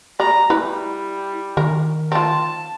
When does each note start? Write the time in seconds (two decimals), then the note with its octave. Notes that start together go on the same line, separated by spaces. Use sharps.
0.20 G3 D5 A#5
0.50 G3 E4 B4
1.57 D#3 A#4
2.12 C4 F4 A5